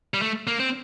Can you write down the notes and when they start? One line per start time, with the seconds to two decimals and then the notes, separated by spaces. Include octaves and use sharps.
0.14 G3
0.22 A3
0.47 A#3
0.60 C4